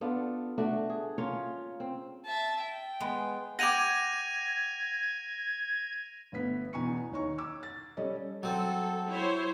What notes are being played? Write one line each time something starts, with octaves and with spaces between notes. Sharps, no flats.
B3 D4 F4 A4
A3 D4 F#4
G#4
A#3 C#4 F4 C#5
C4
E5 A5
G5
G#3 B3
F#5 G5 D6 G#6 A#6 D#7 F7
G1 A3 B3 B6
E2 B2 G#5 A#5 C#6 C#7
D#2 D#4 C#5 A#5 C#6
D6 E6 G#6
A6
G3 C#4 A4 D5 D#5
F#3 C4 A4
E4 C5 C#5